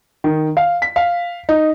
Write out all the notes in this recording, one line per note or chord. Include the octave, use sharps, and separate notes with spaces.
D#3
F5
B6
F5
D#4